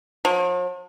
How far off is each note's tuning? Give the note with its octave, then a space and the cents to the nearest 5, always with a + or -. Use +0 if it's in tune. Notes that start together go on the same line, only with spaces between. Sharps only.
F3 +45